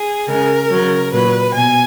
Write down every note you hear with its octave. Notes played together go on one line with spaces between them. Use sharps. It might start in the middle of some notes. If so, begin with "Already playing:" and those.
Already playing: G#4
C#3 G#3 A#4
C#3 F#3
A#2 F#3 B4
B2 G#5